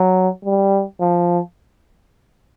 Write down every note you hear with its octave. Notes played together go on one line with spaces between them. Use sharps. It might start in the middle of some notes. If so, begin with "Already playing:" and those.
Already playing: F#3
G3
F3